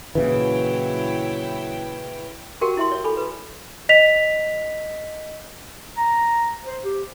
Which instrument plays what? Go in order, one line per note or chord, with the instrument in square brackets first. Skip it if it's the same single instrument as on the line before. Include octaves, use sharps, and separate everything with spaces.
[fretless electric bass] A#2 C#3 E3 [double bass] F#3 [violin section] E4 C#5 G5 [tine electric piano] B4
[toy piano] F#4 G4 A#4 F#5 G5
E4 E5 C6
C#5
A4 G#5 B5
B4
[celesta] D#5 B6 F7
[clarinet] A#5
C5
G4